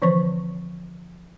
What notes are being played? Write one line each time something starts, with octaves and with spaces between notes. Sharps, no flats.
D3 E3 F3 C4 C5 C#6